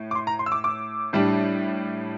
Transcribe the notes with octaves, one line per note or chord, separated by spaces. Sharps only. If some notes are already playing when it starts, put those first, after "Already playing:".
Already playing: A2
D6
C6
A#5
C6
E6
D6
D6
A2 G3 D4